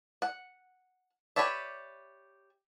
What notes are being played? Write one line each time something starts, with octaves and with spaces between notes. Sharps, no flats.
F#5
G4 B4 C#5 D5 E5